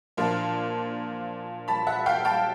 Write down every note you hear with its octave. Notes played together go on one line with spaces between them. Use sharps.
A#2 F3 A#3 D4 F4
A5 B5
E5 F#5
F5 G5
G5 A5